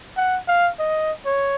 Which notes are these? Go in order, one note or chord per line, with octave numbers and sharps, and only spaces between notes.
F#5
F5
D#5
C#5